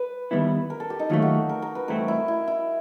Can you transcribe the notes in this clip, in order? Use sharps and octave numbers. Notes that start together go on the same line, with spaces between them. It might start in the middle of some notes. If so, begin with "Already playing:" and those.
Already playing: B4
D#2 D#3 G3 B3 E4
A#4
A4
G4
D#4
D#2 D#3 F#3 A3 F4
F#4
A#4
A#4
B4
G2 E3 A3 C4 A#4
E4
E4
E4